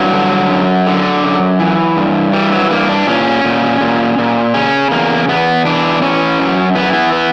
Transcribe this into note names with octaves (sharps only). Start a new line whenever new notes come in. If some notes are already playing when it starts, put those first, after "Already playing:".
Already playing: G2 E3 F#3
D3
F#2
D3
F#2
E3
G2
E3 G3
F#3
G2 A#3
D4
A#2 C#4
A#2
A#2
A#2
C#3 C#4
E2 A#3
E2 B3
E3 D4
E3 C#4
F#2
E3 B3
B3
B3